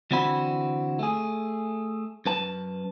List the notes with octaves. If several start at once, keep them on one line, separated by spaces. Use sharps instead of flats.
D3 E3 C4 E4 F#4 B5
A3 G#4
F#2 B4 A5